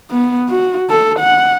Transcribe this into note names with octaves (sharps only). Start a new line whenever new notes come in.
B3
F#4
A4
F#5